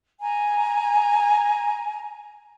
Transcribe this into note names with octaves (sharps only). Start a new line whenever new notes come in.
G#5 A#5